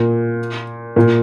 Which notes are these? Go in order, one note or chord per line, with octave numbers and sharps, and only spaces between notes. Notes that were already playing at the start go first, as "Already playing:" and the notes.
Already playing: A#2
A#2